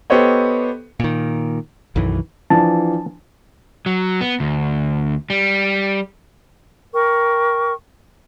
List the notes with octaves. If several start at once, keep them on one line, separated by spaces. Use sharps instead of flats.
B3 G4 A4 C5 C#5 D#5
A#2 D#3
B1 F#2 D#3 E3
E3 F3 D4 A5
F#3
B3
D2
G3
A#4 G5 C#6